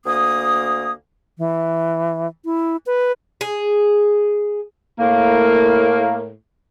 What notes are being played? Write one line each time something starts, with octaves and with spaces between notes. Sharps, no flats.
D2 A#3 D#6
E3
E4
B4
G#4
A2 A#3